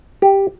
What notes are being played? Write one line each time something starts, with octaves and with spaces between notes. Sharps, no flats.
G4